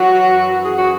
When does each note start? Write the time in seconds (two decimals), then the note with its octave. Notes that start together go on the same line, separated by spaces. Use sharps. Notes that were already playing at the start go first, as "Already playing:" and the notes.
Already playing: E3 F#3 F#4
0.23 F#2
0.65 E3 G#4
0.77 F#4